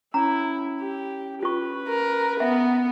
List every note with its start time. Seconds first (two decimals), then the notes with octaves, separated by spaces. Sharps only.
0.14 C#4 E4 A#5
0.80 G4
1.43 F4 B4 C#6
1.88 A#4
2.40 B3 E5